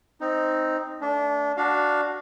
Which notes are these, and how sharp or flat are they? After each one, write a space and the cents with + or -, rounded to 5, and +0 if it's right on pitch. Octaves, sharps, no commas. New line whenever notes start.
C4 +0 D#4 +0
A3 +0 D4 -25
D4 +0 F#4 +5 F5 +15